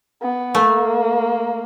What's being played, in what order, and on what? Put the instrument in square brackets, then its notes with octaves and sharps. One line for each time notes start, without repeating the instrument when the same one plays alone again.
[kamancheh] B3
[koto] A3 [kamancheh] A#3